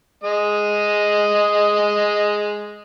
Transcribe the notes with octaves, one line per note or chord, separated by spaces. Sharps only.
G#3 D#5